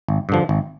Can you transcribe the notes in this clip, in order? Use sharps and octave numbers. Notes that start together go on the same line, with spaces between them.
G#1
G2 D3 F3
G#1